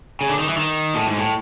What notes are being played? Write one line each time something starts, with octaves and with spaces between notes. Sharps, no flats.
C#3
D3
D#3
E3
D#3
A2
G#2
A2